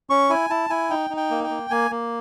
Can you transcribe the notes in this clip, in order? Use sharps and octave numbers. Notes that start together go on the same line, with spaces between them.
C#4 C#6
E4 G#5
E4 A5
E4 G#5
D#4 G5
D#4
G5
A#3
G5
A#3
A#3 G#5
A#3